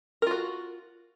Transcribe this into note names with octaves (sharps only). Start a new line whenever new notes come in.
F4 F#4 A#4